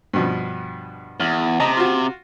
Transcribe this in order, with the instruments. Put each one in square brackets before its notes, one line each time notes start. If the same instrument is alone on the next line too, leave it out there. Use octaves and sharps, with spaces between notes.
[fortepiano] G2 B2 F3
[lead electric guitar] E2 [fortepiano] F6
[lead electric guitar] C3 [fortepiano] D#5 A5 A#5
[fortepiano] F4 F#4